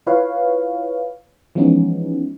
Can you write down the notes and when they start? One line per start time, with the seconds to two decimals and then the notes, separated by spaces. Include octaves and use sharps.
0.07 E4 F4 B4 C#5 F5
1.55 E3 F3 G#3 B3 C#4 D#4